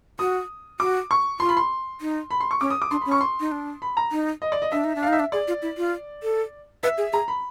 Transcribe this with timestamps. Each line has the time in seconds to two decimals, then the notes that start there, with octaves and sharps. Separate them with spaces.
0.19 F#4 D#6
0.80 F#4 D6
1.11 C#6
1.40 F4 C6
1.49 B5
1.57 C6
2.01 D#4
2.31 B5
2.40 C6
2.51 C#6
2.61 C#4 D6
2.70 D#6
2.82 D6
2.91 D4 C6
3.01 C#4 B5
3.11 C#6
3.21 C6
3.40 D#4
3.52 D4
3.82 B5
3.97 A#5
4.12 D#4
4.42 D#5
4.52 D5
4.62 D#5
4.72 D4 E5
4.84 D#4
4.96 D4
5.03 F5
5.08 D#4 E5
5.20 D4
5.32 G#4 D5
5.48 F4
5.62 E4
5.77 F4
6.23 A4
6.83 B4 E5
6.98 G#4
7.13 G#4 A#5
7.28 B5